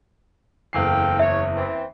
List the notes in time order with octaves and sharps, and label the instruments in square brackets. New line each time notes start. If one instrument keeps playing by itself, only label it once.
[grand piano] F#1 E2 C7 [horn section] A4 F5 G5
[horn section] C#5 [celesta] E5
[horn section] E3 C4